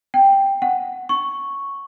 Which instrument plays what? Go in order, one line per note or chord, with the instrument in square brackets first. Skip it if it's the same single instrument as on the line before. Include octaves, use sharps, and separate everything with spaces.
[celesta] G5
F#5
C#6